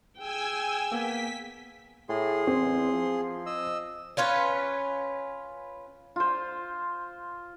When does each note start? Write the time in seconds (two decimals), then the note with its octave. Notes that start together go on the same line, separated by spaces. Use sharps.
0.18 G#4 G5 G#5 E6
0.92 A#3 B3 B6
2.09 A2 G#4 C6
2.47 E2 C4
2.92 F3
3.46 D#5 E6
4.17 C#4 F4 B4 C#5
6.16 F4 C5